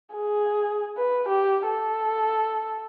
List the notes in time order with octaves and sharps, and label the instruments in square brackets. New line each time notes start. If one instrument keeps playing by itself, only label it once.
[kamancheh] G#4
B4
G4
A4